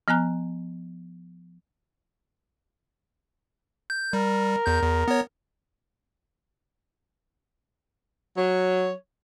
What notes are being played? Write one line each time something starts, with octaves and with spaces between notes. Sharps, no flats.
F3 B3 G#5 A#5 F#6
G6
G3 A#4
E2 G6
E2
B3 C#5
F#3 C#5